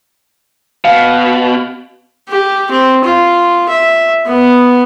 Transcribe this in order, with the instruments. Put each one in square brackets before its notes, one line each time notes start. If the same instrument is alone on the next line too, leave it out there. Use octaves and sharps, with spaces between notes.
[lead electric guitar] B2 [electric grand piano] F5
[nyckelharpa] G4
C4
F4
E5
B3